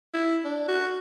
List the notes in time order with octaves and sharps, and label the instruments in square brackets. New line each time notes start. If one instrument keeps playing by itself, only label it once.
[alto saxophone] E4
D4
F#4